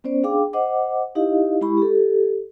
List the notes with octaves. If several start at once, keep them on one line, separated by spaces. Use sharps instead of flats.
B3 C#4 C5 D5
D4 G#4 F5 G5 D6
C5 D#5 F#5 D6
D#4 E4 G4 D#5 F5
G#3 E4 G4 B5 C#6
G4 A4